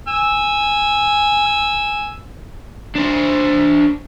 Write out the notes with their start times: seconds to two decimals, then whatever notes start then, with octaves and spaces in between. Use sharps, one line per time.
0.08 G#5 E6
2.96 D4 C5